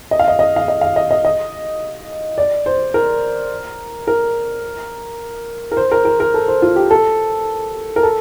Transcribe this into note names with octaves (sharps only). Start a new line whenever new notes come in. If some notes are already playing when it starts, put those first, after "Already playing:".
D#5
F5
D#5
D#5
F5
D#5
F5
D#5
D#5
D#5
D5
C5
A#4
A#4
A#4
C5
A#4
A#4
A#4
A4
C5
F4
G4
A4
A#4
A4